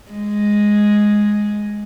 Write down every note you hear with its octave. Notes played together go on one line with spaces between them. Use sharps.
G#3